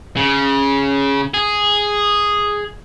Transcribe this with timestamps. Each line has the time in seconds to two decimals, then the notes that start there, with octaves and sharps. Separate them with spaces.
0.17 C#3
1.34 G#4